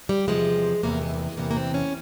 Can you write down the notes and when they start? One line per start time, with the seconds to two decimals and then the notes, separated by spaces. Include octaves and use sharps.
0.09 G3
0.28 E2 C3 F3 G#3
0.83 E2 C3 E3 A#3
1.02 G#3
1.14 A#3
1.19 G#3
1.37 E2 C3 E3 A#3
1.51 A#3
1.57 C4
1.74 C#4